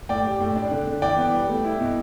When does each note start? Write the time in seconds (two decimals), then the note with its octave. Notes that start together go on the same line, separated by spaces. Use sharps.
0.09 A2 D5 G5
0.25 G4
0.40 A2
0.56 D4
0.71 D3
0.87 D3
1.02 E3 D5 G5
1.17 B3
1.33 G3
1.48 A3
1.64 E4
1.80 B2